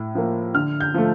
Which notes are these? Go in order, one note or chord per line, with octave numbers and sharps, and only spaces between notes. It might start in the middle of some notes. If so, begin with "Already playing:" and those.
Already playing: A2
F3 A#3
D3 F6
G6
F3 A3